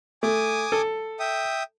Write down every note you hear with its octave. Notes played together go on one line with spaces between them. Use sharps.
A3 G#5 D6 D#6
A4
E5 G5 D#6